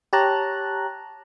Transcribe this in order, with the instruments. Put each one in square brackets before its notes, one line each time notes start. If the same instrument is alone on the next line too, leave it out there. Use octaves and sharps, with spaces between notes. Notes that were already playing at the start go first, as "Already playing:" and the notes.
[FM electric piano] G4 C#5 A5 A#5 F#6